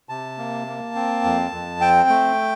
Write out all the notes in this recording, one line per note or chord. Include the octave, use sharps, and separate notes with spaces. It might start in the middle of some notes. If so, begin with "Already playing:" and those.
C3 A5
A#3
A#3
C4
F2
F2
C4 G5
A3